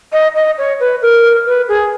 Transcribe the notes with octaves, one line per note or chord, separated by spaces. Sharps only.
D#5
D#5
C#5
B4
A#4
B4
G#4